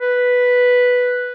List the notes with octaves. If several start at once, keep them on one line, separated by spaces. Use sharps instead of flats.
B4